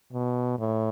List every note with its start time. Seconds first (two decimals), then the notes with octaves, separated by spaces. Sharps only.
0.13 B2
0.59 A2